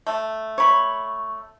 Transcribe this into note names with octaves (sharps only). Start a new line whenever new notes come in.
A3
C#5 B5